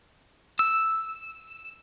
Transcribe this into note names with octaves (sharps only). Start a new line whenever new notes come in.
E6